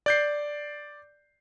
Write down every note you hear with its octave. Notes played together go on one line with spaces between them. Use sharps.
D5 G6 C7